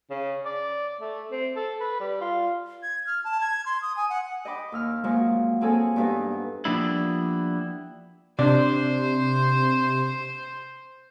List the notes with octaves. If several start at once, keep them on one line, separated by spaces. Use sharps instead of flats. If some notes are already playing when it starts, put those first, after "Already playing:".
C#3
D5
A3
C4
A4
B4
G3
F4
G#6
F6
A5
G#6
C6
D#6
G#5
F#5
D#5 G5 B5 D6
D#2 E6 F6
F3 F#3 G#3 A#3 F#4
A#3 C4 G#4 A4 C#5 G#5
G2 E3 B3 D4 D#4
F3 G3 A#3 B3 D4 E4
C3 D4 C5